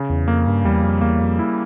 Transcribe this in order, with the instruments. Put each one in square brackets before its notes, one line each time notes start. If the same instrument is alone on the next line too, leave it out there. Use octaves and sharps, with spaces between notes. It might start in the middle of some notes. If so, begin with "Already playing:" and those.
Already playing: [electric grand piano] C#3
[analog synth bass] E2
[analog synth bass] F2 [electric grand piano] A#3
[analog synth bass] G2
[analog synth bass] E2 [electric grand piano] G3
[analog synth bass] F2
[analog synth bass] E2 [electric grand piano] A#3
[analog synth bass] F2
[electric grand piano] E4